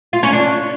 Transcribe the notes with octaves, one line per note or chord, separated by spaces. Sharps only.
F4
C#4
D4